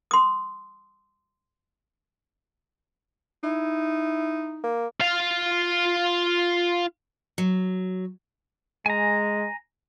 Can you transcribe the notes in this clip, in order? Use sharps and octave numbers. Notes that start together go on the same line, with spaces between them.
C6 D#6
D#4 E4
A#3
F4 F5
F#3
G#3 G#5 A#5